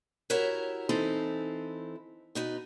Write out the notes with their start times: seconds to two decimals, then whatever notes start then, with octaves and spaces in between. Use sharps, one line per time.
0.30 E4 F#4 G4 A#4 C#5 E5
0.89 E3 C4 D#4 E4 A4
2.35 B2 D#4 B4